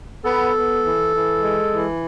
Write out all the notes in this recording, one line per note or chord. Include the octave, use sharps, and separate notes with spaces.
B3 A4
B3
E3
E3
G#3
E3